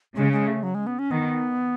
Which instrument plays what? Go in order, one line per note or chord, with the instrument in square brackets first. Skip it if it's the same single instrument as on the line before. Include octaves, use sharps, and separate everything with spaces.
[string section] C#3 [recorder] G#3
[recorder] G#3
A3
F#3
G#3
B3
C#4
[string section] D#3 [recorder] B3